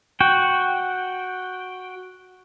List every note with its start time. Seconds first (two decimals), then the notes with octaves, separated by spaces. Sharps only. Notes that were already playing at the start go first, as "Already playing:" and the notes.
0.20 F#4 G5